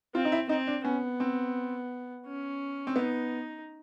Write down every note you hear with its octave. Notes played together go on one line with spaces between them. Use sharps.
C4 F4
D#4
E4
C4 D#4
D4
B3 C#4
C4
C#4
C4
B3 D#4